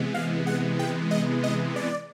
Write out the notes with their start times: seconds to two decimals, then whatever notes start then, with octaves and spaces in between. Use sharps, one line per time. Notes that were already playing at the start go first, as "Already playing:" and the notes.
Already playing: C3 E3 G#3 B3
0.14 F5
0.47 F#5
0.79 G5
1.11 D#5
1.43 D#5
1.76 D5